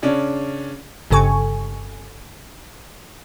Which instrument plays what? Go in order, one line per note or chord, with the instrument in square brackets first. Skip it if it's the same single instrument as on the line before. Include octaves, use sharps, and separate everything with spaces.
[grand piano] C#3 C#4 D4
[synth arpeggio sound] G1 G2 C#3 A4 G#5 C#6